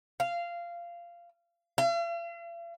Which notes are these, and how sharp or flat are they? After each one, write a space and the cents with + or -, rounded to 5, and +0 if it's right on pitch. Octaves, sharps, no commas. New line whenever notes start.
F5 -15
F5 -45